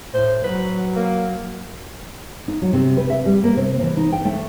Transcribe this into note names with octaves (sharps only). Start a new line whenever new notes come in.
A2 C5
F#3 B4
A#3
D#4
F#3
C3
B4
E5
G3
A#3
C3
E3
D#4
G5
A3